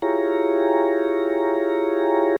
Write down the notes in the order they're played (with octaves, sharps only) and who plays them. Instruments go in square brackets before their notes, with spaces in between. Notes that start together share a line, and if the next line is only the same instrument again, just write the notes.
[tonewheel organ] E4 F4 G4 G#4 C#5 A#5